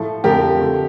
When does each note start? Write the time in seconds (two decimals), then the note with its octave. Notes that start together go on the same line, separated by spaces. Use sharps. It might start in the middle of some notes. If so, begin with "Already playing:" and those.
Already playing: A2 F3 A3 A4
0.24 F2 D3 F3 G4 A#4
0.61 D3 A3